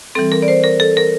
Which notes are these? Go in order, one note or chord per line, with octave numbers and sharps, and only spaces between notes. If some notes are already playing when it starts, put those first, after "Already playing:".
E3 G3 C4 A4
A#4
D5
C5
A#4
A4
A#4